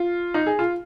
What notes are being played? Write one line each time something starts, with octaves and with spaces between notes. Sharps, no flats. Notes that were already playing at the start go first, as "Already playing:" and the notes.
Already playing: F4
D#4
G#4
F4